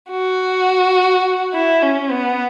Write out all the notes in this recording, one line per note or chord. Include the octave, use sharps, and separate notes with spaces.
F#4
E4
C#4
B3